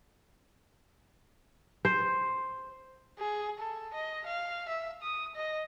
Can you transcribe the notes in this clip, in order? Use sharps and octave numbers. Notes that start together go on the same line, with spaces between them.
C5
G#4
A4
D#5
F5
E5
D#6
D#5